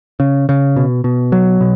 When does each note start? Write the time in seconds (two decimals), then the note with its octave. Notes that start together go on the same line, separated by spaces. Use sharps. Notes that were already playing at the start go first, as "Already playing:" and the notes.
0.20 C#3
0.49 C#3
0.76 B2
1.04 B2
1.32 F#3
1.61 B2